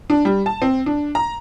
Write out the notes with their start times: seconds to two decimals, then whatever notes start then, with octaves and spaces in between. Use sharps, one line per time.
0.10 D4
0.25 G3
0.46 A5
0.62 C4
0.86 D4
1.15 A#5